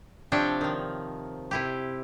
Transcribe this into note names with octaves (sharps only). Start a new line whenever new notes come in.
C3 F3 D4 C#5 E5 G5
D#3 F3
C3 E4 G4